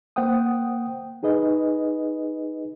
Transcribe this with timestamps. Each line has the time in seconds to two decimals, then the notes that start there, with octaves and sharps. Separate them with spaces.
0.16 A#3 C5 F#5 G5 D#6
1.23 D#4 G#4 B4 D#5